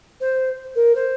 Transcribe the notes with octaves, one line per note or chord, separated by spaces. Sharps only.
C5
A#4
C5